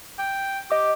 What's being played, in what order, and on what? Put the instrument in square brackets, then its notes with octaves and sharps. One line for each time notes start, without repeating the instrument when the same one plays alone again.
[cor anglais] G5
[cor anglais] G4 [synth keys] D#5 D6